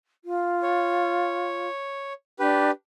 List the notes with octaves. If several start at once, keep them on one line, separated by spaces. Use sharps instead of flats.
F4
C#5
D4 G4 B4